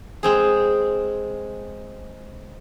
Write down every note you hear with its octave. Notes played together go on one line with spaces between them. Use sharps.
G#3 C4 G#4